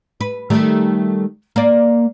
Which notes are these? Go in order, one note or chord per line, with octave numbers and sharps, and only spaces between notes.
B4
D#3 G3 A3
A#3 D5